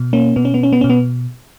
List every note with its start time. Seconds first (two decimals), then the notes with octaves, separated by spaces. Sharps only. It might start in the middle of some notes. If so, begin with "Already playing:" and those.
Already playing: B2
0.13 A#3 C#4
0.36 B2 B3
0.45 C#4
0.54 B3
0.63 C#4
0.73 B3
0.81 B2 C#4
0.90 B3